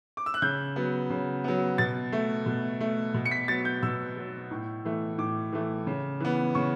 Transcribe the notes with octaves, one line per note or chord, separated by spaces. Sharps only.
D6
E6
F#6
C#3 G6
F#3 B3
C#3
F#3 B3
B2 A6
A3
B2
A3
B2
C#7
B6
F#3 B3 A6
G6
B2 E6
F#3 B3
A2
E3 A3
A2 D6
E3 A3
C#3
E3 B3
C#3 C#6